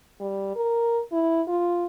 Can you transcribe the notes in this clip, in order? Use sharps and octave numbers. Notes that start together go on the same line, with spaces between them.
G3
A#4
E4
F4